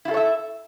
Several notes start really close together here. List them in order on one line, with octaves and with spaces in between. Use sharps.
E4 F4 A4 C#5 E5